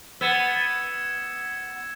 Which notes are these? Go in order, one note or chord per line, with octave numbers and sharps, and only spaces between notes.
B3 E6 G#6 C#7 E7